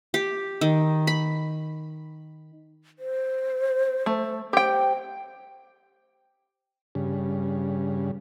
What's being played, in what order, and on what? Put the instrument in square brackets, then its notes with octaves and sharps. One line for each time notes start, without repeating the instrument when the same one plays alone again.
[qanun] G4
D#3
B5
[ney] C5
[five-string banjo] A3
[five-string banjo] G4 G5 [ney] C5
[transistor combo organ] G2 C#3